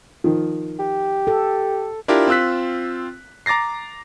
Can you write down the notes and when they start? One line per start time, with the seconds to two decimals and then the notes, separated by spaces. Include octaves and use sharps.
0.24 D#3 F3
0.80 G4
1.27 A4
2.08 D4 E4 F4 G4 A#4
2.28 C4 F4 E6 F#6 B6
3.46 A#5 D6 A6 A#6 C7